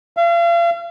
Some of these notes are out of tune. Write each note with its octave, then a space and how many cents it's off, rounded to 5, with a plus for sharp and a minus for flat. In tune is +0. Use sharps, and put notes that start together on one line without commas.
F5 -40